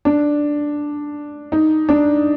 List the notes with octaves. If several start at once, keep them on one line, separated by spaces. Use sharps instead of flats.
D4
D#4
D4